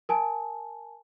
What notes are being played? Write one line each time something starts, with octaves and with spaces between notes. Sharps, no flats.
A#4 G#5 A5